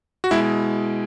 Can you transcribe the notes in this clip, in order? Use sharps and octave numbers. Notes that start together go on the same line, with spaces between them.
F#4
B2 G#3 E4